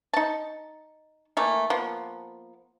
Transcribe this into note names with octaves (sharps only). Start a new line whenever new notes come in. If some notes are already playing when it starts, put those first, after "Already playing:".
D#4 A5
E3 A3 A#3
F3 A#3 B3